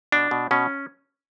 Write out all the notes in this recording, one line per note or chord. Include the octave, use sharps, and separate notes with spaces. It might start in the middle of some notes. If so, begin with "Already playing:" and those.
B2 D4
B2
B2 C#4